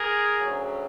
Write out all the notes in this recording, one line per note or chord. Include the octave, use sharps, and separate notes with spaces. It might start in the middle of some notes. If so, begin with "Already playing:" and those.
Already playing: G#4 A#4
D2 C#3 F#3